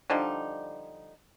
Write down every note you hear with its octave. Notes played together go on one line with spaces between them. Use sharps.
D3 F3 G3 D#4